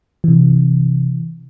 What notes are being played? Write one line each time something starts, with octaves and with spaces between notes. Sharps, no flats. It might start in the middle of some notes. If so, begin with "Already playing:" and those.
C3 E3